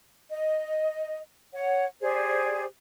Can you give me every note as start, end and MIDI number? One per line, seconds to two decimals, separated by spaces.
0.31 1.20 75
1.53 1.85 73
1.53 1.85 78
2.01 2.64 67
2.01 2.64 68
2.01 2.64 72
2.01 2.64 74